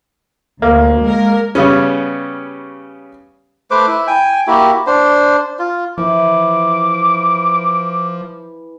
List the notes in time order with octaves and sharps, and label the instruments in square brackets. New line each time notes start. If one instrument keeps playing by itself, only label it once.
[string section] D2 [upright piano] A#3
[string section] G#3 A#4
[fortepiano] C#3 G3 B3 C#4
[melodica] A3 B4 C5 D6
E4
G5 G#5
A#3 E4 F#4 G4
D4 C5
F4
[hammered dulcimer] E3 [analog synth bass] F3 [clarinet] D6